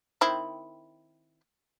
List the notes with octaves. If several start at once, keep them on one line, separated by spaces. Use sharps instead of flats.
D#3 C4 E4